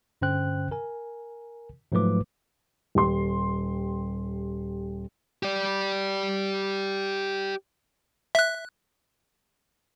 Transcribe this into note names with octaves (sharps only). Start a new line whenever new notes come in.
G2 D3 C#4 C5 G5 F#6
A#4 G#5
G#2 F3 F#3 A3 B4 D6
D#1 G4 C6
G4 D5
E5 F#6